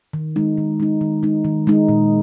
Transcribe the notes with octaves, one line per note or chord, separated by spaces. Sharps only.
D#3
G#3 D#4
D#3
G#3 D#4
D#3
G#3 D#4
D#3
G#3 D#4
A#2